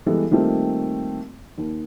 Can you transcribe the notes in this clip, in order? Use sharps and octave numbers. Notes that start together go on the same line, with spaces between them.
E3 G3 G#3 B3 A4
D#3 G3 A3 A#3 C4 F4
D#2